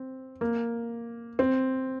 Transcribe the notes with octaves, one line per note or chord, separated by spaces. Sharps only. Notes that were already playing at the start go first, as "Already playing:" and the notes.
Already playing: C4
A#3
C4